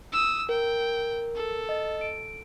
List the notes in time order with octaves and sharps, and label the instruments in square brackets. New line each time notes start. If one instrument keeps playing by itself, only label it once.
[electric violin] D#6 E6
[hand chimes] A#4 [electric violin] G5
[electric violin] A4
[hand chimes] D#5
D7